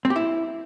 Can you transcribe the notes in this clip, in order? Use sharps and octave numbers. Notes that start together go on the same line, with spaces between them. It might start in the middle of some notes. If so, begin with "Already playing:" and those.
C4
G4
E4